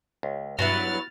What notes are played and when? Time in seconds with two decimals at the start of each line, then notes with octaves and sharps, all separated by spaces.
0.23 C#2
0.59 G2 F#3 B3 E4 F#4 F6 A6